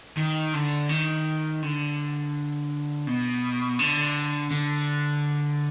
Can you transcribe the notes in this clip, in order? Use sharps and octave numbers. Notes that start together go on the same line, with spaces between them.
D#3
D3
D#3
D3
B2
D3
D3